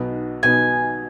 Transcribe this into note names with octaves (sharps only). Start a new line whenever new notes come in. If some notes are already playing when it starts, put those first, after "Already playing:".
Already playing: B1 B2 B3 D#4
B1 B2 B3 D#4 G#5